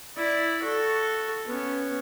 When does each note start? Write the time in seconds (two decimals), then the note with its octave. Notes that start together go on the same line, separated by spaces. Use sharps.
0.17 E4 D5
0.63 F#4 A4
1.45 B3 C#4